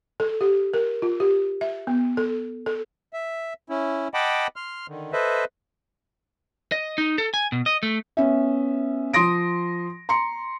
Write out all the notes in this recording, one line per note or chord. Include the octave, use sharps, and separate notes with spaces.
A4
G4
A#4
F4
G4
E5
B3
A4
A4
E5
C#4 E4
D#5 F#5 G5 A5 B5 D6
C6 F6
D3 D#3
A4 B4 C5 D#5 E5
D#5
D#4
A4
G#5
B2
D#5
A3
B3 C#4 E5
F3 C6 D#6 A#6 D7
A#5 C6 C#7